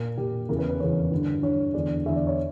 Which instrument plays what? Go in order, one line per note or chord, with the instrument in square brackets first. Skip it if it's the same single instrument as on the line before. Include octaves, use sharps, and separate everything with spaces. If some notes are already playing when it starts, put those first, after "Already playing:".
Already playing: [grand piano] A#2 A#4
A#2 G4
E2 C#3 E3 A#4
B4
B4
E2 C#3 E3 C#5
G2 D3
G2 D3 C#5
E2 D3 D5
E2 D3 E5
D5
C#5